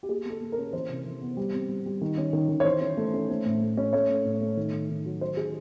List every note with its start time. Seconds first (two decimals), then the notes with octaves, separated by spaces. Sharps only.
0.03 G4
0.09 A#3 G#4
0.25 A#3 A4
0.41 A#3
0.52 A#4
0.58 C#4
0.73 E3 C5
0.89 C3
1.06 E3
1.21 B3
1.37 G3
1.53 C4
1.69 G3
1.86 G3
2.01 D#3
2.17 C#4
2.33 D#3
2.49 D#3
2.60 C#5
2.65 E3 C5
2.81 C#4
2.97 A3
3.14 C#4
3.30 A3
3.46 A2
3.61 A3
3.77 C#4
3.93 A3 C#5
4.09 A3
4.25 A2
4.41 A3
4.57 D#3
4.73 D#3
4.90 D#3
5.06 F#3
5.21 F#3 C5
5.36 D#3 G#4